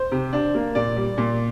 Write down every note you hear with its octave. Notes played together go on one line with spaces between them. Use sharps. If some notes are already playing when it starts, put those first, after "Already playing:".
Already playing: C5
C3
D4
A#3
A#2 D5
G3
A#2